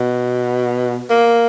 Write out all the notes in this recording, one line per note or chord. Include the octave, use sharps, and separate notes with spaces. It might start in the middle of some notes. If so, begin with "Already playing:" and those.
Already playing: B2
A#3